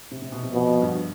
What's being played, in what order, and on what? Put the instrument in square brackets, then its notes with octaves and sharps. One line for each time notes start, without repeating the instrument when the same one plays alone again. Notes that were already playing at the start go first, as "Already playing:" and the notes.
[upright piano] C3
C3
B2
C3
[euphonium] B2 [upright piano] F3
[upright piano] F3
G2